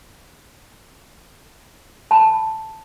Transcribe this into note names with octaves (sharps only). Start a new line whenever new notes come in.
A5 B5